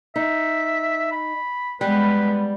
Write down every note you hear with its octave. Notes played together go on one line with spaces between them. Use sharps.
D#4 E5
B5
G3 G#3 B3 B4